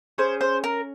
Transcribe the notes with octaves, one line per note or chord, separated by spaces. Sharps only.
C#4 G#4 C5
C5
A#4